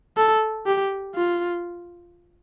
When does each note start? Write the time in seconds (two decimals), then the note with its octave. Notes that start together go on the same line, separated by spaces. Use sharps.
0.17 A4
0.66 G4
1.16 F4